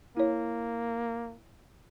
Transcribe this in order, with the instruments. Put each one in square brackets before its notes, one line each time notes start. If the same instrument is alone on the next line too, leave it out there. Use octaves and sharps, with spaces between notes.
[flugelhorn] A#3 [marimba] E4 C#5